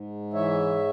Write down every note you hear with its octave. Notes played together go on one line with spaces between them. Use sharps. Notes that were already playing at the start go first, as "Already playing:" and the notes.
Already playing: G#2
E3 C#5 E5